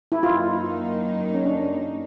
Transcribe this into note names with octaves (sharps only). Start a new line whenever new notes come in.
E4
F#2 D#3 F#3 A#3 D#4 F4
C#4
D4